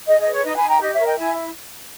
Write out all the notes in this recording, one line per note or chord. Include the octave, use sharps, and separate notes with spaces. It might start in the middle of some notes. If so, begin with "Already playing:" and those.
G#4 D#5
D#5
B4
C#5
D#4 D#5
G#5 B5
D#4
G5 A#5
G4 D#5
C#5 E5
A#4
D#5 G5
E4 E5 G#5